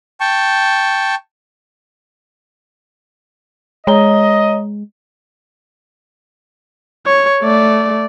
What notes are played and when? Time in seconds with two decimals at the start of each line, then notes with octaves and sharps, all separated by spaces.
0.20 G5 A5 C#6
3.87 G#3 C#5 D#5 A#5 G7
7.06 C#5
7.43 A3 D5